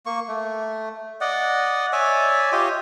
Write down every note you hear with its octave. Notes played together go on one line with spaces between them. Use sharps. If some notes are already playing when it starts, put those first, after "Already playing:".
A#3 C#6
A3
D5 D#5 F#5
C#5 D5 E5 G#5
F4 G4 C#5 D#5